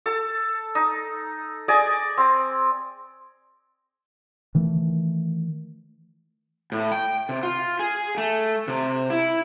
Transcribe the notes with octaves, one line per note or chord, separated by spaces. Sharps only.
A4
D#4
G#4 D5 D#5 G#5
C4
D#3 E3 A3
A2
G5
C3
F4
G#4
A3
C3
E4